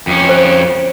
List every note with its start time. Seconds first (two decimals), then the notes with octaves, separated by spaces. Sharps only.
0.07 F2 C#4
0.29 C5